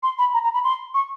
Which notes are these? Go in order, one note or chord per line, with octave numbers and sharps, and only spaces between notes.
C6
B5
A#5
A#5
B5
C6
C#6